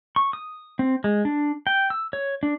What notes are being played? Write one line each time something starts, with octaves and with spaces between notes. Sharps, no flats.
C#6
D#6
C4
G#3
D4
G5
E6
C#5
D4